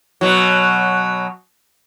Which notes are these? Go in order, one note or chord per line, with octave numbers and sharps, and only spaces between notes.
B2 F#3